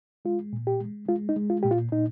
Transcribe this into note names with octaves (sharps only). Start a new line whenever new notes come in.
G#3 F4
A#2
G4
G#3
G#3 F4
D#4
G#3
F4
A#2 G4
F4
A#2 D#4